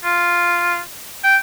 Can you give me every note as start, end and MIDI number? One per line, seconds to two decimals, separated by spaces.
0.04 0.79 65
1.24 1.37 79